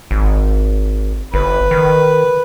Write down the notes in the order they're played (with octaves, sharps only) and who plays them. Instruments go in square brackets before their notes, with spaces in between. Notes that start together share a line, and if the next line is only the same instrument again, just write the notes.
[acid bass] G#1
[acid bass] G1 [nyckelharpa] B4
[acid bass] D#3